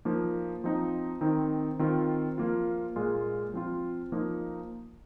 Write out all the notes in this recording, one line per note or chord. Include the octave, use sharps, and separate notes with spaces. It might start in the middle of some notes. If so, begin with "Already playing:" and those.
F3 A#3 D#4
F3 C4 D#4
D#3 C4 D#4
D#3 C4 F4
F3 A#3 F4
A#2 G#3 F4
F3 C4 F4
F3 A#3 D#4